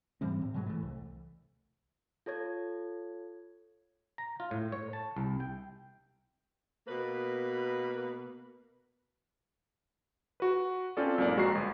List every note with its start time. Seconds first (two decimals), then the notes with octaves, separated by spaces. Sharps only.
0.21 G#2 E3 G3 C4
0.42 A2
0.54 G#2 B2 F#3 G#3
0.66 E3 A3
0.83 C2
2.26 F4 A4 C#5 G#6
4.18 A#5
4.40 F4
4.51 A2
4.72 C#5
4.93 A5
5.17 C2
5.40 G5
6.87 B2 A#3 B4
10.40 F#4 B4
10.97 C4 C#4 F4 A4 D5
11.18 B1 G#2 A#3 D5
11.35 A#1 G#3 F#4 A#5 C7
11.52 G1 C7